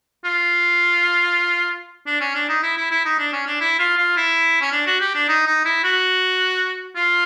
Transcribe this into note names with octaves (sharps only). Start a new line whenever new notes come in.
F4
D4
C#4
D4
D#4
E4
E4
E4
D#4
D4
C#4
D4
E4
F4
F4
E4
C#4
D4
F#4
G4
D4
D#4
D#4
E4
F#4
F4